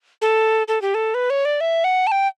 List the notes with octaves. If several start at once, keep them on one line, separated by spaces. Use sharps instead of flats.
A4
A4
G4
A4
B4
C#5
D5
E5
F#5
A5
G5